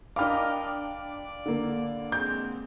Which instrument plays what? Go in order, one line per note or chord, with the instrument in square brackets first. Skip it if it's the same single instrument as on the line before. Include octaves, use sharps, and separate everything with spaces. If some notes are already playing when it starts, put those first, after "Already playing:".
[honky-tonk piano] D4 G5 D6 [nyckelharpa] A#4 D#5 [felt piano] F5 B5 F6
[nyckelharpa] D5
[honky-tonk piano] D3 A#3
[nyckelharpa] G#3 C4 [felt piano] G6